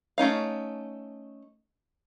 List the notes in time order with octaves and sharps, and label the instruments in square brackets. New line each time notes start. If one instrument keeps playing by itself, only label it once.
[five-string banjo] A3 C#4 D#4 F5